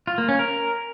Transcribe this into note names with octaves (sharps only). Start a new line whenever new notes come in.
F4
A#3
C#4
A#4